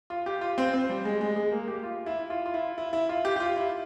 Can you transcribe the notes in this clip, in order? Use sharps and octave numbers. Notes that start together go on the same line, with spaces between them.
F4
G4
F4
C4
C4
G3
G#3
G#3
G#3
A#3
G4
F4
E4
F4
F4
E4
E4
E4
F4
G4
G4
F4
E4